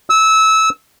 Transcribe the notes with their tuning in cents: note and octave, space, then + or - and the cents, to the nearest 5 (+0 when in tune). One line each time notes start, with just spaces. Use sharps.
E6 -20